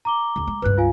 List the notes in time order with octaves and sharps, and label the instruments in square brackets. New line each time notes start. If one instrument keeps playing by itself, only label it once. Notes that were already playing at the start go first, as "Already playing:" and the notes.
[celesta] A#5 D6 G7
[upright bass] D#2 D3
G#3
[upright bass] C#2 G2 [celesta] B4 F#6
[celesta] F4 F5 G#5